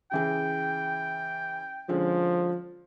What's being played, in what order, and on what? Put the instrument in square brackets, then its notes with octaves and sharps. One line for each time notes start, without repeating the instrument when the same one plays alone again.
[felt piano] C#3 E3 G#4 [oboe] G5
[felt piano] D3 G#3 C#4 [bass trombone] F3